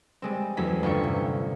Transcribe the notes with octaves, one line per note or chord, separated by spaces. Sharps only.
G3 G#3 C4
E2 F#3 A3 C#4 B6
G1 F4 G5 C#6 C#7
C3